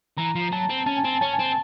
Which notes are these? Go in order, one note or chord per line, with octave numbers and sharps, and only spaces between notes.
E3 A#5
F3
F#3 A5
C4
C#4 A5
G#5
C4 A5
C#4 A5
G#5
C4
A5